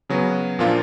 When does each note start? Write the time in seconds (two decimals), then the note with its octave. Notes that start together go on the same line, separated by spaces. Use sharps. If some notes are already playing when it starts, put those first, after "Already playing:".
0.10 C#3 F#3 B3
0.59 A#2 F3 A#3 D4 F4